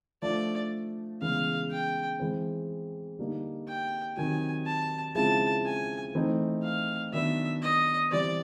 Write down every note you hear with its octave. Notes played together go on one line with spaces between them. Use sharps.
F3 A3 D4 D5
C#3 E3 G#3 B3 F5
G5
E3 G#3 C4
D3 G3 A#3 D#4
G5
C3 D#3 F#3 G#5
A5
C#3 F3 G#3 C4 E4 A5
G#5
E3 A3 C4 D#4
F5
D#3 F#3 B3 D4 E5
D#5
E3 G3 C4 D5